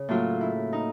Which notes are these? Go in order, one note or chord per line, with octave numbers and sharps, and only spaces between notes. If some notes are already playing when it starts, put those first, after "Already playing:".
Already playing: C#3
A2 F#3 A#3 F4
E4
D#4